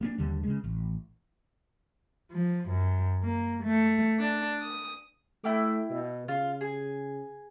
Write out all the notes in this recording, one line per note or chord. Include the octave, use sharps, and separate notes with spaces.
A#3 B3 D4
D#2 D3 G3
C#3 G#3
A1
F3
F#2
A#3
A3
D4
D#6
A3 E4 G5 D6
B2
C#3 F4
G#4